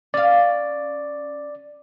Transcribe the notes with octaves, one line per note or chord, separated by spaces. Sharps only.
C#4 D5 F5